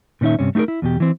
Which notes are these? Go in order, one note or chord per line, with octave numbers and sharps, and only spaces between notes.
A#2 D#3 C#4 D#4 E5
G2 C3 C#4
A3 D#4 F#4 G#4 A#4
E4
E2 B2 G4
E3 C4